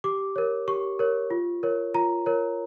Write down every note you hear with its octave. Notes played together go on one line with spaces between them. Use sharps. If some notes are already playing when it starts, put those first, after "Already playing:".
G4 D6
A#4 C#5
G4 C#6
A#4 C#5
F4
A#4 C#5
F4 A#5
A#4 C#5